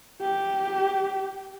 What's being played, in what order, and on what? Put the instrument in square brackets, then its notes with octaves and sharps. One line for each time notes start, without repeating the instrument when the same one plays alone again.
[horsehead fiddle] G4